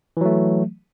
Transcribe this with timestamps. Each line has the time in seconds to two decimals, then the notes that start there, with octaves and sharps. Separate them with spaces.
0.17 E3
0.21 F#3
0.25 A3